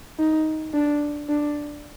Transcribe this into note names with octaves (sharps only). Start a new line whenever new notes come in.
D#4
D4
D4